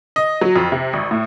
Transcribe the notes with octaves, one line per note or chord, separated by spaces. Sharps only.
D#5
F#3
F2
C3
G#1
A2